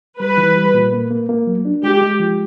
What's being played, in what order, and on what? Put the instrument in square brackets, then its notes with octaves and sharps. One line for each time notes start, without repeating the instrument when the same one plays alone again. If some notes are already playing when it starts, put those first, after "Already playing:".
[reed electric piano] G3 [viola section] B4
[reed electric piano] E3
G3
A#2
A#3
A#3
A#3
F#3
D4
[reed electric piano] G#3 [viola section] G4
[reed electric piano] G#3
F3